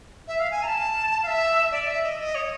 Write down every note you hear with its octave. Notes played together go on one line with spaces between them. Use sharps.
E5
F5
G#5
A#5
A5
F5
E5
D5
E5
D#5
D#5
C#5